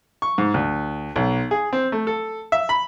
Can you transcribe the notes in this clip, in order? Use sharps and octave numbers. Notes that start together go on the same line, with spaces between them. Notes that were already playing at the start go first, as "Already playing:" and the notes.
C#6
G#2
D2
B1
G#4
C4
A3
A4
E5
B5